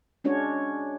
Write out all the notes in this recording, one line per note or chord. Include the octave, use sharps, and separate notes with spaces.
G#3 C#4 D4 F#4 C#5